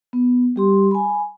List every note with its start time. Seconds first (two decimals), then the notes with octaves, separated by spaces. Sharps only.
0.13 B3
0.56 G3 G4 C6
0.91 G#5 B5